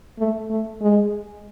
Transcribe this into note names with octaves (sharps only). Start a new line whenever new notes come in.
A3
A3
G#3